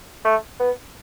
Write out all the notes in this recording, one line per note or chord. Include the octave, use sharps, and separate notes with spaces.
A3
B3